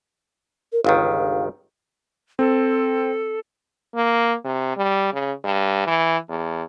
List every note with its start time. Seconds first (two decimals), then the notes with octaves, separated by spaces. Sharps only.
0.73 A#4
0.84 G1 C#2 D#3 F5
2.39 C4 A4
3.95 A#3
4.45 C3
4.77 G3
5.13 C#3
5.44 G2
5.87 E3
6.29 E2